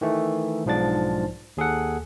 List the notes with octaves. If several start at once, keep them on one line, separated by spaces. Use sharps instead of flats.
D#3 E3 A3
B1 G#2 F3 D4 A6
D#2 G#4 A4 F#5